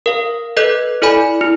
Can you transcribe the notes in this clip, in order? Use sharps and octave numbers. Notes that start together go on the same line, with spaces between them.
A#4 F5
A4 B4 D#5 F#6 G6
E4 A4 D5 G#5 B5
E4